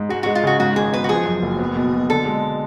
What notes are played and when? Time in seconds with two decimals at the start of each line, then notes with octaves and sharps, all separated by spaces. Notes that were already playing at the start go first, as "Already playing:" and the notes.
Already playing: G#2
0.09 G#3 F#4
0.23 G#3 F#4
0.35 F4
0.43 C#3 F#4
0.60 G#2 F#4
0.76 G#1 G#4
0.93 B3 B4
1.04 F#4
1.09 F3 G#4
1.26 F#2
1.42 F#1
1.59 B3
1.76 B2
1.92 B2
2.09 D3 A4
2.26 G#3